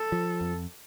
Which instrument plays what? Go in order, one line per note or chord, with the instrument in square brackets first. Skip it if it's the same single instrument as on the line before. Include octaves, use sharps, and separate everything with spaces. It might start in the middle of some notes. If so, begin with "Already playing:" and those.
Already playing: [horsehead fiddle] A4
[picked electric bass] F3
F2